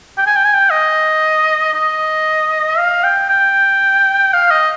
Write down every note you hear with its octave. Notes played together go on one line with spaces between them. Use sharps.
G5
G#5
G5
G#5
G5
D#5
D#5
F5
G5
G5
F5
D#5